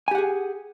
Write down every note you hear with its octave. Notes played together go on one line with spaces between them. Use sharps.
G4 G#4 F#5 G#5